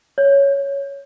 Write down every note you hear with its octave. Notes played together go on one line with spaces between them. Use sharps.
C#5